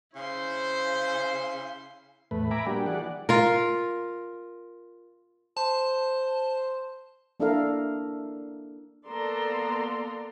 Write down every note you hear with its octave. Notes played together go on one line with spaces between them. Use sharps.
C#3 E4 C5 C6
E2 A2 A3 B4
E5 G#5 A#5 B5 D6
G3 A#3 D4 F#4 G4
E3 G#4 D5 F#5
F4 A#4
C5 A5
A#3 D4 E4 A4 A#4 F5
A#3 B3 A4 D5 A#5 C6